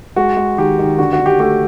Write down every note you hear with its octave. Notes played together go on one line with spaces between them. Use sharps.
G#3 F#4
G#3
D#3 G4
D#3
D3 F#4
F#4
D3
G4
A3 G4